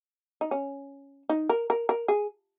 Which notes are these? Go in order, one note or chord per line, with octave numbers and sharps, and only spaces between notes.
D#4
C#4
D#4
A#4
A#4
A#4
G#4